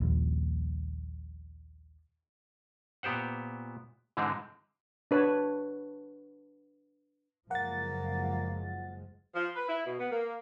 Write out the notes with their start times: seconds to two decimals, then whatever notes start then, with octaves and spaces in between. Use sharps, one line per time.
0.01 A#1 D#2 F3 G3
3.03 A#2 B3 G4 C5 F#5
4.17 G#2 D3 E3 G#3 C4
5.11 D4 B4 C#5 A5
7.51 F#1 F3 G#3 A#3 F#5 A6
9.35 F3
9.56 B4
9.69 E4
9.87 B2
9.99 B3
10.11 A#3